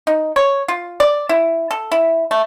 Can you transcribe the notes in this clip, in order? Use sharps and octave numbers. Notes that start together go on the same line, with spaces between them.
D#4
C#5
F4
D5
E4
A4
E4
A3